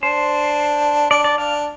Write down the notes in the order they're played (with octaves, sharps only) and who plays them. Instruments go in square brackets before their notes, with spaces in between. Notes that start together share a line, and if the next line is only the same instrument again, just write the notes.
[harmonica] D4 [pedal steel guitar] C5
[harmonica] D4 [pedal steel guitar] D5
[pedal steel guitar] D5
[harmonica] D4 [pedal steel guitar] F5